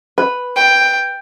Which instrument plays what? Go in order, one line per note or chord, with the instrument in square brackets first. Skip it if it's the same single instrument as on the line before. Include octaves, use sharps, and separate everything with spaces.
[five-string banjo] B4
[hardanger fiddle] G5